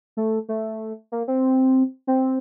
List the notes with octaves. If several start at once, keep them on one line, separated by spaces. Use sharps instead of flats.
A3
A3
A#3
C4
C4